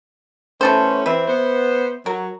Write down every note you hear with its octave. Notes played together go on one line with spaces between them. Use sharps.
E3 A3 B3 C#4 A4 C5
E3 C4 B4 E5
B3 C5
F#3 A#4